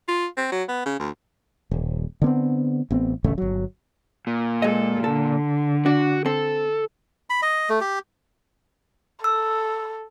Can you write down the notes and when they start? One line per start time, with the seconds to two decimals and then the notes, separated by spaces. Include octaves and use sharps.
0.08 F4
0.37 C4
0.52 F#3
0.69 B3
0.86 C#3
1.00 D2
1.71 D#1
2.22 D3 B3 C4
2.91 A1 B3 C4
3.24 D1 A1 C#3 A3
3.38 G1 F#3
4.27 A#2
4.62 G#3 A4 D#5
5.04 D3 A4
5.86 D4 F#4
6.26 C4 A4
7.30 B5
7.42 D#5
7.69 A3
7.81 G4
9.24 A4 E6